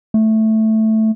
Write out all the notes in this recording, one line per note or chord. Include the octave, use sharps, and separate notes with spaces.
A3